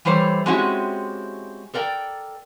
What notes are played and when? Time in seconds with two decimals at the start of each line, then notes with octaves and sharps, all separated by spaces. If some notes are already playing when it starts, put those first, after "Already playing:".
0.05 E3 G3 A3 C5 C#5
0.46 G#3 C4 C#4 E4 F#4 G4
1.74 A4 A#4 D5 F#5 G5